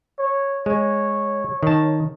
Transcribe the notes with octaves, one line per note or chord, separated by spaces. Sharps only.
C#5
G#3 C#5
D#3 A5